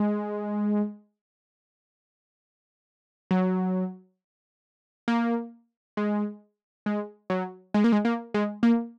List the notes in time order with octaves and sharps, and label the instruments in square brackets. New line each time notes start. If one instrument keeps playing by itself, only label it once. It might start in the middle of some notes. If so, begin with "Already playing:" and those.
Already playing: [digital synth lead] G#3
F#3
A#3
G#3
G#3
F#3
G#3
A#3
G#3
A#3
G#3
A#3